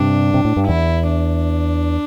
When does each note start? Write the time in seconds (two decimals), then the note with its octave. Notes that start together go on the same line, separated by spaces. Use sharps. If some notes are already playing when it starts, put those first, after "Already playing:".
Already playing: G2 C3 D4
0.34 C3
0.45 A2
0.57 G2
0.68 E2 E4
1.13 D4